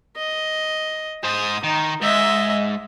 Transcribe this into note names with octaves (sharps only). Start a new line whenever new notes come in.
D#5
G#2 C5 D#6
D#3 D#4
G#2 D#5 E5